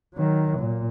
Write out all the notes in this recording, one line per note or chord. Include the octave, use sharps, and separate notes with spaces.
D#3 F#3
A#2